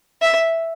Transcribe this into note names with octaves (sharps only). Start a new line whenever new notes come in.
E5